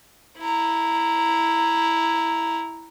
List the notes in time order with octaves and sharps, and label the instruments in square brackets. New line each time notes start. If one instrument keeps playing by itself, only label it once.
[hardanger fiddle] E4 A#5